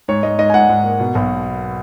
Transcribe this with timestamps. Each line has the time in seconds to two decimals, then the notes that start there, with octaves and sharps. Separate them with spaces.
0.08 G#2 C#5
0.23 G#2 D#5
0.38 G#2 D#5
0.50 G#5
0.54 G#2 F#5
0.69 G#2
0.84 A#3
1.00 B2
1.15 B1